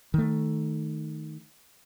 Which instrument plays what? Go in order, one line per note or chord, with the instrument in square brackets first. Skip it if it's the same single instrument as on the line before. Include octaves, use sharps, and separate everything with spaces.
[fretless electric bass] D#3 A3